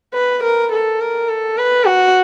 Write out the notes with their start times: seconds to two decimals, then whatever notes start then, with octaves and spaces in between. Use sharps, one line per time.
0.14 B4
0.44 A#4
0.72 A4
1.01 A#4
1.29 A4
1.58 B4
1.87 F#4